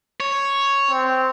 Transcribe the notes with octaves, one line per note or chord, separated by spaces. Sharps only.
C#5
C4